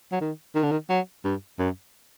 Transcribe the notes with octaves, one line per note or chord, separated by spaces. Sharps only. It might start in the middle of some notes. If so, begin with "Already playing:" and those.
F#3
D#3
D#3
D3
D#3
F#3
G2
F#2